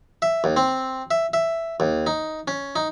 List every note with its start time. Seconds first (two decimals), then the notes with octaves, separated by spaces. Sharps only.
0.22 E5
0.44 D#2
0.56 C4
1.11 E5
1.33 E5
1.80 D#2
2.07 D#4
2.48 C#4
2.76 D#4